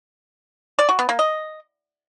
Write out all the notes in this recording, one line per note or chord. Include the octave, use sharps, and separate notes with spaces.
D5
F#4
B3
A#3
D#5